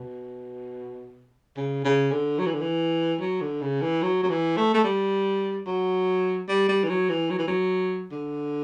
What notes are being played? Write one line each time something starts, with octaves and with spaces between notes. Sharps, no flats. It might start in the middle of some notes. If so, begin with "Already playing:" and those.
Already playing: B2
C#3
C#3
D3
F#3
E3
D3
E3
F#3
D3
C#3
E3
F#3
F#3
E3
A3
A3
G3
F#3
G3
G3
E3
F#3
E3
F#3
E3
F#3
D3